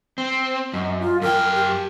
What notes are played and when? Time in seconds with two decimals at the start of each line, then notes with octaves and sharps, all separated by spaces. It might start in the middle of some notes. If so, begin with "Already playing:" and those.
0.18 C4
0.73 F#2 D#5
1.00 F4
1.22 F#2 A#4 G5
1.55 G4